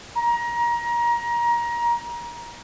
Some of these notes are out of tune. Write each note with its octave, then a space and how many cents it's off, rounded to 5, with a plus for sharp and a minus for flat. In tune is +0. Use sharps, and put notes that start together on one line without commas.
A#5 +25